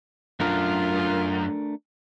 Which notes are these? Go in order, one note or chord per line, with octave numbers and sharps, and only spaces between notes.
F#2 A3 D4 F4 A#4